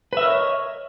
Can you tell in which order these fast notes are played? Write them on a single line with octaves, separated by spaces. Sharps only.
B4 E5 A#4 C#5 D#5